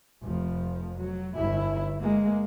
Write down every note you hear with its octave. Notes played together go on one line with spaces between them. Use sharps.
F1 F3
F#3
G1 E4
G#3 A#3